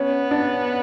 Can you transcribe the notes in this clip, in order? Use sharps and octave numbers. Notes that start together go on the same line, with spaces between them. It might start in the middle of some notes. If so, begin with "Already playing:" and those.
Already playing: B3 C#4
D4